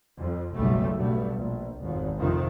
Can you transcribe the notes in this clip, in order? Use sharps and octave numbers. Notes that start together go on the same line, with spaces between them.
F2
F#1 B1 G3 A3
G2 B2 A3
A#1
G#1 F2
F2 C3 D#3